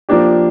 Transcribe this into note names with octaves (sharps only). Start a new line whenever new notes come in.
F3 A#3 D4 G4